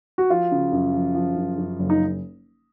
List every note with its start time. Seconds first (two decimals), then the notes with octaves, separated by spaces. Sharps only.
0.18 F#4
0.30 F3 F4
0.52 C#3
0.72 F#2
0.94 F3
1.15 F3
1.36 F#2
1.58 F#2
1.79 F#1
1.90 D#4